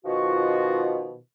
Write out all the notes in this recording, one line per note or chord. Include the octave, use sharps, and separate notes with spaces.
B2 D#3 F3 F4 F#4